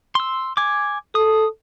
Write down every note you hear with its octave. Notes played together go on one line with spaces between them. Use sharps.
C6 E6
G#5 D6
A4 D#6